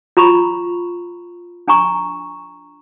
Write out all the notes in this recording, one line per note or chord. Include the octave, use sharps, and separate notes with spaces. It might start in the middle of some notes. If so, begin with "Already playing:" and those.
F4 A#5 B5 C#6
D4 G#5 A#5 C#6